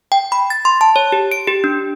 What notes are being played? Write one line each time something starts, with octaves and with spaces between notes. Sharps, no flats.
G5
B5
A6
C6
A5
C#5
G4
D7
G4
D4